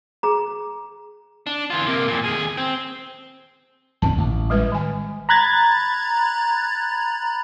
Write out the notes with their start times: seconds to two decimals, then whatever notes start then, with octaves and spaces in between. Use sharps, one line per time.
0.23 G#4 A#5
1.47 D4
1.70 E3 F4
1.86 C3 A#3
2.08 F2 A#2
2.24 D#2 G#4
2.57 C4
4.02 D1 F2 D#3 C#4 A5
4.18 A1
4.50 G3 G#3 B4
4.72 D#3 G#5
5.29 A#5 B5 F#6 G#6 A6